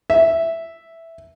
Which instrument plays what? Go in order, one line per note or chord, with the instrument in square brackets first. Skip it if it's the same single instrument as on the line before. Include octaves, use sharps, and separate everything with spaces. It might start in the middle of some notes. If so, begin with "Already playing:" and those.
[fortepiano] E5